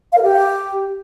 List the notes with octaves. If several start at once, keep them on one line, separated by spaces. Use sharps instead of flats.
F5
A#4
G4